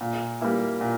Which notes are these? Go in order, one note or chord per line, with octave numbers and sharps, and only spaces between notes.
A#2
G3 A#3 E4
A#2